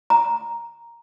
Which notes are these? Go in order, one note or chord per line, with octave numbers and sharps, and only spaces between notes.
A#5